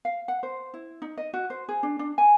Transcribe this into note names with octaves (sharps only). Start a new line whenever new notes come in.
F5
F#5
C5
E4
D#4
D#5
F#4
C5
G#4
D4
D4
G#5